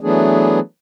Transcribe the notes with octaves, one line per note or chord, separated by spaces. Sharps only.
E3 F#3 A3 B3 D4 G#4